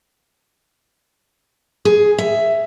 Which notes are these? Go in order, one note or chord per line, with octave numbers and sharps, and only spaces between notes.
G#4
E5